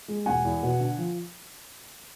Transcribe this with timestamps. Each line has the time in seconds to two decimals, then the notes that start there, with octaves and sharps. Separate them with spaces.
0.08 G#3
0.26 E1 F#5 G#5
0.45 E2
0.63 B2
0.80 D3
0.98 F3